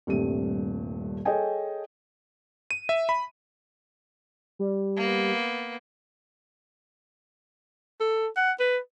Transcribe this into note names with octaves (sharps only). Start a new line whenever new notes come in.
D#1 G2 C3 A3 D#7
G#4 A4 C#5 D#5 G5 G#5
D#7
E5
B5
G3
A#3 B3
A4
F#5
B4